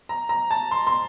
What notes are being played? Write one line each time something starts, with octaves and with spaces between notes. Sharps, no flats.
A#5
A#5
A5
C6
C6